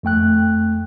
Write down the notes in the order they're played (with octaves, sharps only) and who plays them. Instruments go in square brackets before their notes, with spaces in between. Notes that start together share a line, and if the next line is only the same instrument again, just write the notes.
[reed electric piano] F2 A3 G5 F#6